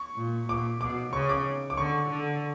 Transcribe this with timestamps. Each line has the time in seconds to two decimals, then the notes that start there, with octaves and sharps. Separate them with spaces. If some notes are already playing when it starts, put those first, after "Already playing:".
Already playing: C#6
0.16 A#2
0.49 A#2 D6
0.81 B2 D6
1.13 C#3 C#6
1.29 D6
1.70 D6
1.77 D3 C#6
2.10 D3